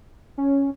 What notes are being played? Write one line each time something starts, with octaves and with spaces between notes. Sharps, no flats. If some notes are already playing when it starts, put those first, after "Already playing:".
C#4